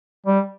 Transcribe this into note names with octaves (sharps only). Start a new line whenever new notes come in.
G3